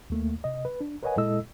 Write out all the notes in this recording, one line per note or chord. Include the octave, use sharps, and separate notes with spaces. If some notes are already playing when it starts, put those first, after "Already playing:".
D#2 A3 A#3
C3 D#5
B4
D4
A#4 B4 C#5 D#5 F#5 G#5
A#2 G#3 E4 A4 D#5 E6